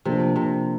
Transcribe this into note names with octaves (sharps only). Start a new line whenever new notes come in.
C3 F3 A#3 D4
C3